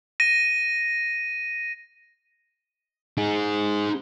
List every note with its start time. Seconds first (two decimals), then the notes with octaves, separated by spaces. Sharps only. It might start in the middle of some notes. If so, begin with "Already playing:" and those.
0.20 A#6 D#7
3.18 D#4 G#4